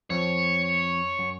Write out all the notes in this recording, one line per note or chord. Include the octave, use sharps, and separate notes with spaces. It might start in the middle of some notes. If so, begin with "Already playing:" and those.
F2 F3 C4 C#5
F#2